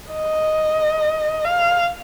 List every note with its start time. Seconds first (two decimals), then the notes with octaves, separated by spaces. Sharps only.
0.12 D#5
1.45 F5